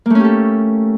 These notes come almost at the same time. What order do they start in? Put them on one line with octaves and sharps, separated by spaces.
A#3 A3 C#4 G4 A4